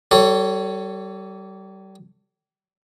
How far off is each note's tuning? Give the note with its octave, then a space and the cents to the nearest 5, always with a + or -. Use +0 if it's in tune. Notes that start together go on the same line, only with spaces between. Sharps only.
G3 -30 A4 +20 C#5 +0